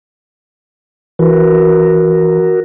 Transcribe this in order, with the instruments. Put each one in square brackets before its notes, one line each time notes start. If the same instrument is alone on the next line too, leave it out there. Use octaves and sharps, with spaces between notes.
[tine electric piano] E3 [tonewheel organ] F#4 A#4